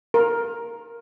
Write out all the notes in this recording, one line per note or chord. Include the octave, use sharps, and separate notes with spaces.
A#4